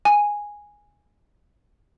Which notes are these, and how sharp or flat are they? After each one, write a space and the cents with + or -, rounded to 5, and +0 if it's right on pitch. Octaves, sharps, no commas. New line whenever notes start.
G#5 -5